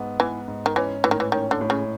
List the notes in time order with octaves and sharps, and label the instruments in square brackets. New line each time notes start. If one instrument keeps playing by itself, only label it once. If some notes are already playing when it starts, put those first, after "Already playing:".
Already playing: [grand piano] G#2 B3
[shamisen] E3 [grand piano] B3
[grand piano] G#2
[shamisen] D#3
[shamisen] E3 [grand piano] C#4
[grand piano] A2 [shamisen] E3
[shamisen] D#3
E3
[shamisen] D#3 [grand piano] C#4
[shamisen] D3
[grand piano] A2
[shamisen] C#3